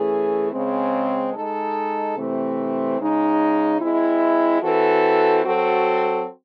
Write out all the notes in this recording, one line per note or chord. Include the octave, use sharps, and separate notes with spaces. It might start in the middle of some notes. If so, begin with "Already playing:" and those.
Already playing: E3 A3 C#4 G#4
C#3 G#3 C4
G#3 D#4 A4
C3 E3 A3 C4
C#3 G#3 D#4
G#3 C4 E4
E3 C4 F#4 A4
F#3 C4 F#4 A4